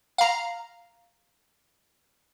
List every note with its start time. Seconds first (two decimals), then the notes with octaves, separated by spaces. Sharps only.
0.18 F5 A#5